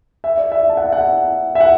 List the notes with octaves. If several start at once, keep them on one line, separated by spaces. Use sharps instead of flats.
E5
D5
E5
A5
F#5
E5
F#5
E5
F#5